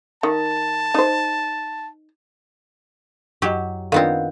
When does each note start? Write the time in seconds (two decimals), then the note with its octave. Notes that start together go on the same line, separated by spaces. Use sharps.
0.23 D#3 A5
0.94 D#4 C5
3.42 F#2 F#3 G4 D#5
3.92 D#3 B3 C4 D4 F4 D5 F5